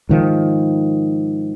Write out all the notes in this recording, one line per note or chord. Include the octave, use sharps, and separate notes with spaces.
G#2 D#3 F3